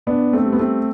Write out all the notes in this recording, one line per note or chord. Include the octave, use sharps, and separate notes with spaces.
B2 B3 D4
A3 C4
G3
B3
A3 C4